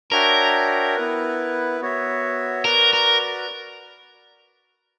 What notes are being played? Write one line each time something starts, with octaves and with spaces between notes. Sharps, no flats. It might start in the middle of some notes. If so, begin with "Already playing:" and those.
D4 F#4 A#4 C#5 E5 G5
B3 E4 B4
B3 F#4 C#5 E5
F#4 A#4 B4 D5
A#4